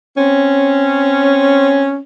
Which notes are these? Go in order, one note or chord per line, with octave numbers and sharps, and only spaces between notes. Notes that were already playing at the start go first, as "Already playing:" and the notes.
C4 C#4